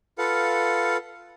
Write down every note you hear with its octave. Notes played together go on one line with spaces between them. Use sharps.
F4 A4 B4 F5 F#5